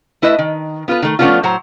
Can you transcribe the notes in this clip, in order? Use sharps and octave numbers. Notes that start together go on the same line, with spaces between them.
A3 E4 B4 D#5 E5
D#3
B3 F4 A4 B4
D#3 A3
F3 A3 B3 C#4 D4 F4
A2 F#3 C5 A#5